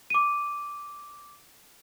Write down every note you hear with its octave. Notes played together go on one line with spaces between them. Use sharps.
D6 D#7